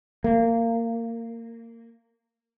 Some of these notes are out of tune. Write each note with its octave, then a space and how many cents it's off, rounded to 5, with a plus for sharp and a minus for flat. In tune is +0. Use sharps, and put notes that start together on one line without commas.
A#3 -20